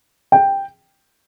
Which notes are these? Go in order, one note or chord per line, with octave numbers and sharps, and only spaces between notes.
G5